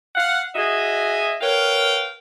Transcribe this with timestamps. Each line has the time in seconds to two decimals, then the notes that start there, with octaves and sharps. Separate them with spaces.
0.15 F5 F#5
0.55 F#4 G#4 D#5 E5 G#5
1.41 A#4 B4 C#5 F5 G5